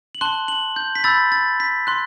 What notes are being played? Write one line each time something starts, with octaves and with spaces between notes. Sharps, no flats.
F#7
A5 C6 F#6 G7
F#7
G6
B6
B5 E6 G6 A6
A6
B6
C6 F#6